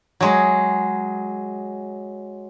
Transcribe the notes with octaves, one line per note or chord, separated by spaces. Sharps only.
F#3 G#3